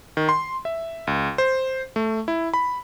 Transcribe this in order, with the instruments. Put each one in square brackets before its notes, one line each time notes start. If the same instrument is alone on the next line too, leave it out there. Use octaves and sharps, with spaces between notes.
[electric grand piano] D#3
C6
E5
C#2
C5
A3
E4
B5